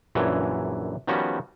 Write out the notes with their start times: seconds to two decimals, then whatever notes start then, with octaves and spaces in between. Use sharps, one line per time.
0.15 A#1 F#2 D3 E3 C#5
1.07 D#3 F3 G3 B3 C#4 F#4